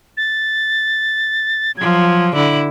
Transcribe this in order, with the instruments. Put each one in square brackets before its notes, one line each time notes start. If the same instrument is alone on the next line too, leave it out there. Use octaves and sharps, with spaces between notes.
[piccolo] A6
[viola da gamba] F3 F#3 [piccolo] G#6
[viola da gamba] D3 E4 [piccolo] F#7